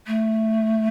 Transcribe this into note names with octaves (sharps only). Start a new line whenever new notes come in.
A3